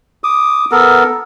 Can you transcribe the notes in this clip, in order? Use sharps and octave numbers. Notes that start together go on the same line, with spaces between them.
D6 D#6
B3 A4 A#4